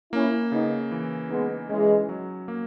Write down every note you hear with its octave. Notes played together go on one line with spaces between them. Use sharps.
A#3 C#4 E4
C#3 B3 D#4
E3
G#3 B3 D#4
E3 G#3 C#4
F#3
A#3